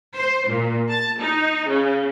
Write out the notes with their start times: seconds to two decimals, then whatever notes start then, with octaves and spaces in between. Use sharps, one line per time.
0.17 C5
0.49 A#2
0.90 A5
1.19 D#4
1.67 C#3